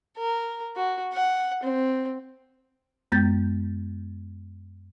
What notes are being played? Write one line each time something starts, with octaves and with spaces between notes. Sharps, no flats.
A#4
F#4
F#5
C4
F#2 G#3 B3 G6 A6